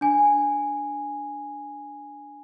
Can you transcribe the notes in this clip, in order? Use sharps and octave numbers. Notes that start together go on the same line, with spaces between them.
D4 G#5